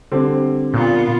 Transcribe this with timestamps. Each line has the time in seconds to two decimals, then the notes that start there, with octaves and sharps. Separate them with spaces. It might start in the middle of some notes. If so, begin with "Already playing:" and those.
0.12 D3 G3 C4
0.74 A#2 B3 F4